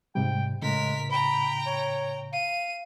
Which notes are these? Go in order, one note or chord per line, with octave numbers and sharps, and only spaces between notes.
G#2 C3 G3 G5
A2 C#3 G#3 A#4 B6
G5 A#5 B5
C#5
F5 D#7